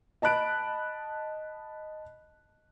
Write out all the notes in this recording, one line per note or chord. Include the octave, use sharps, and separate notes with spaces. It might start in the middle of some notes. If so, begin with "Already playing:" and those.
D#5 A5 B5 F#6 D7